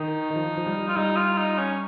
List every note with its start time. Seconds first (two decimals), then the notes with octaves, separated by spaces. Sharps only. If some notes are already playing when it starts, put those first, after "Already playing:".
Already playing: D#3 D#4
0.31 D#3
0.36 F3
0.57 F3
0.66 G3
0.88 F4
0.96 G3 D#4
1.16 F4
1.37 D#4
1.58 C#4